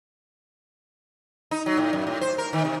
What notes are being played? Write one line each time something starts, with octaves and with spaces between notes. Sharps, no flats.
D#4
F#3
A2
F#2
A2
C5
A#4
D#3
C3